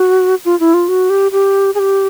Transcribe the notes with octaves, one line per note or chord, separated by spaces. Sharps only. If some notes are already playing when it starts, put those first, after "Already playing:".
Already playing: F#4
F4
E4
F4
F#4
G4
G4
G#4
G4